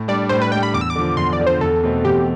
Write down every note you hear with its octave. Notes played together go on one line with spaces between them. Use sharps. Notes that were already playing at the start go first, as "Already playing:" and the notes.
Already playing: A2
G3 D4 D5
A2 C5
B4
G3 D4 G5
B5
E2 D6
E6
D6
D3 F3
E2 C6
D5
D3 F3
C5
E2 A4
B2 A3 C4
E2 G4